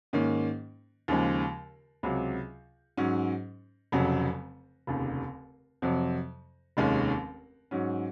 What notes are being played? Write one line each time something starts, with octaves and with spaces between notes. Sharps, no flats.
G#2 D#3 A#3 C#4
D#2 C#3 F3 G#3
C#2 C3 F#3
G#2 F#3 C#4
F1 F2 C#3 F#3
F1 D#2 C#3
F2 C3 F#3
F1 D#2 D#3 G#3 C#4
G#2 F#3 C#4